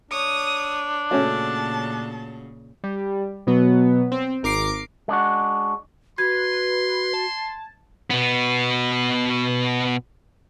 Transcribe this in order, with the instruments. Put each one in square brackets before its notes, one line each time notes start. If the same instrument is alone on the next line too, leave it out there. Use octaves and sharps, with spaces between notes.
[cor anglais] D4 [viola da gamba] C#5 [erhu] D#6
[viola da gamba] A#2 C#3 [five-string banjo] A3 C#4 F#4 [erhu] A5
[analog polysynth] G3
B2 F#3 B3
C4
G#1 A#4 D6 C7 D7
[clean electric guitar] G#3 D4 F#4
[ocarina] F#4 [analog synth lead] B4 [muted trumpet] C6 [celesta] G#6
[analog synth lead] A5
[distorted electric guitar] B2 B3